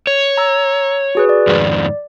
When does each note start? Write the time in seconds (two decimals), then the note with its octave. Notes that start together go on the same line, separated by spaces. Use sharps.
0.07 C#5
0.37 A#5 E6
1.15 F#4 G#4 B4
1.29 D5
1.47 F2 G#2 D#3